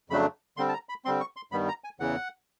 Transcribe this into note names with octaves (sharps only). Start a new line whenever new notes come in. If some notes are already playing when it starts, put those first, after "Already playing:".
F2 C#3 F#3 A3 D4 B5
D3 G3 C4 C6
A5
A#5
B5
D3 G3 C4 C6
C#6
C6
G2 D#3 G3 B3 B5
A#5
G#5
E2 C#3 E3 F#5